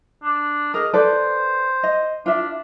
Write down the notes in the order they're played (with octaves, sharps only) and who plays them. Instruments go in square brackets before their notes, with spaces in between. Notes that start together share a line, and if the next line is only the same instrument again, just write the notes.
[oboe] D4
[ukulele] G#4 A#4 [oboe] D#5
[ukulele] A4 B4 D5 [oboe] C5
[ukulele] D#5
[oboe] D4 [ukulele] F4 E5